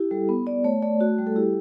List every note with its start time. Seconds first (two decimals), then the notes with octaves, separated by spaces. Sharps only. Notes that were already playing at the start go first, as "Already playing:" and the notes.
Already playing: E4 G4
0.11 G3 A4
0.29 B3
0.47 B3 D5
0.64 A3 C#5
0.83 A3 D5
1.01 F#4
1.18 G3
1.27 A4
1.36 E4 G4